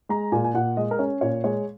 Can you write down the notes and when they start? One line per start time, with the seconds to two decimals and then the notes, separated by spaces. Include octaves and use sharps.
0.09 G#3 A#5
0.32 A#2 G#5
0.45 G#5
0.54 A#2 F#5
0.77 G#3 D#5
0.91 A#4
0.99 C#4 C#5
1.21 A#2 C#5
1.44 G#3 C#5